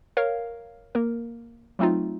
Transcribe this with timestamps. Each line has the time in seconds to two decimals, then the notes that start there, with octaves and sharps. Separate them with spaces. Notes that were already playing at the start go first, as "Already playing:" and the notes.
0.17 A#4 C#5 F5
0.95 A#3 A#4
1.79 F#3 A3 C4 D#4 F4